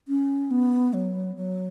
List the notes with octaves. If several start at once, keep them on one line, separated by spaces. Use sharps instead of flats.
C#4
B3
F#3
F#3